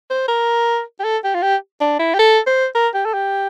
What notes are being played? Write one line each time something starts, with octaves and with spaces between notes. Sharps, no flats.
C5
A#4
G4
A4
G4
F4
G4
D4
E4
G4
A4
C5
A#4
G4
A4
G4